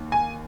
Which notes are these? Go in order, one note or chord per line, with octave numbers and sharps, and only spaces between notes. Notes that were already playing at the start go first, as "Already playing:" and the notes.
Already playing: D#2
G#5